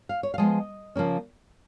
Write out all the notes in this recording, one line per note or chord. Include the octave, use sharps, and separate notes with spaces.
F5
C#5
F5
F3 G#3 B3 D#5
C#3 F3 A#3 C#4